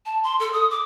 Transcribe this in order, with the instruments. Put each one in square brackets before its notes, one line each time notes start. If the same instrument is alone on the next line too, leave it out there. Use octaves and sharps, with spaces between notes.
[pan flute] A5
C6
A4
D#6
D6